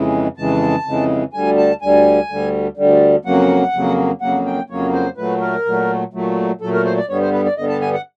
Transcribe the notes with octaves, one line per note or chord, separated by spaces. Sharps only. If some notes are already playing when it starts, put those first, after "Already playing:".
Already playing: F2 C#3 E3 G#3
F2 C#3 E3 G#3 A5
F2 C#3 E3 G#3
D2 D3 G3 G#5
A5
D2 D3 G3 G#5
D2 D3 G3
D2 D3 G3
F2 C#3 F#3 A#3 F#5
F2 C#3 F#3 A#3
F2 C#3 F#3 A#3 F#5
G5
F2 C#3 F#3 A#3 C#5
C5
A#2 F#3 A3 B4
A#4
A#2 F#3 A3
A#2 F#3 A3
A#2 F#3 A3 A4
A#4
C5
D5
G2 D3 G3 B3 C#5
C5
B4
D5
G2 D3 G3 B3 D#5
A5
G#5
F#5